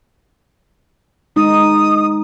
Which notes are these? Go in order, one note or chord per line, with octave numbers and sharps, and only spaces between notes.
G#3 D#4 D#6